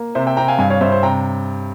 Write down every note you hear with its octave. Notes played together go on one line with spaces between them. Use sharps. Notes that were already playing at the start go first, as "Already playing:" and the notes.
Already playing: A#3
C3 C5 E5
E5 G5
C3 G5 A#5
F5 G#5
G2 F5 G#5
C#5 F5
G2 C5 E5
C5
C3 G5 A#5